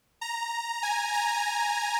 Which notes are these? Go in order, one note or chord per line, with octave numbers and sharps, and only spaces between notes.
A#5
G#5
A#5